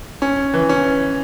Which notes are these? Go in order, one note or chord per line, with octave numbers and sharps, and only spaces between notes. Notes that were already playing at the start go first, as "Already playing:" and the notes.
C#4
E3
C#4